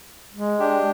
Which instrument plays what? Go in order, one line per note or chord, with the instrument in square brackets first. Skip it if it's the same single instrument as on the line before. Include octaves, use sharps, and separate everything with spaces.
[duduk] G#3
[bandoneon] D4 G4